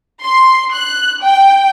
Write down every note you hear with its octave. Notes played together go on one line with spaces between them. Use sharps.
C6
F#6
G5